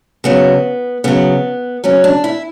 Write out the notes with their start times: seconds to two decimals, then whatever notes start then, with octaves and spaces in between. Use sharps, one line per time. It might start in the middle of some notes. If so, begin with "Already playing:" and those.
0.24 C#3 F#3 B3
1.04 C#3 F#3 B3
1.84 C#3 F#3 C#4
2.04 D4
2.24 E4